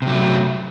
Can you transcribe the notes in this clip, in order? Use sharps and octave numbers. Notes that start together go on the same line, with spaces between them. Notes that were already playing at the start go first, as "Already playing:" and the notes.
C3 F#3 A3